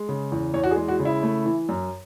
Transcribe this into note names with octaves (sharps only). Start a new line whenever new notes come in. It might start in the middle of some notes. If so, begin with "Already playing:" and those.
Already playing: G#3
C#3
E2
E2 C#5
F#4
G#4
G#3
F#4
C#3
E4
A3
E3
F#2